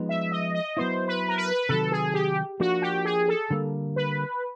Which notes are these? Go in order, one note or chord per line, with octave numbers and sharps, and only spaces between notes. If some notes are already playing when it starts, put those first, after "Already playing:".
Already playing: F3 G#3 B3 D#4
E5
D#5
D#5
F#3 B3 E4 C5
B4
A#4
B4
C3 D#3 F#3 A4
G#4
G4
F3 A#3 D4 F#4
G4
G#4
A4
D3 G3 A#3
B4